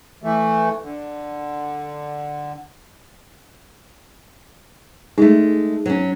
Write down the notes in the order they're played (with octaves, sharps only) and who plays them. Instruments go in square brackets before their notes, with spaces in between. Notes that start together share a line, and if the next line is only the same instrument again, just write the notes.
[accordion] E3 A3
D3
[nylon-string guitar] G#3 A3 [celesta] D#4 G#4
[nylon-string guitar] F#3 C#4